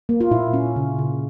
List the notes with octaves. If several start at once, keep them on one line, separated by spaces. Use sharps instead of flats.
A#3
F4
A#2 E4
C#4
C#3
C#3